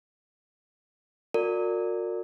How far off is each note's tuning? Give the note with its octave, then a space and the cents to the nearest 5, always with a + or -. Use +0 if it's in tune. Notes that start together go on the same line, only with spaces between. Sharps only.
F#4 -40 A#4 -30 D5 +0